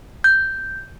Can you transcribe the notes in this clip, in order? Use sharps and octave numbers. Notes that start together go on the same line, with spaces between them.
G6